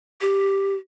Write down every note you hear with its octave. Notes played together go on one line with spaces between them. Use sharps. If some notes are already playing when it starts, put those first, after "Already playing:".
G4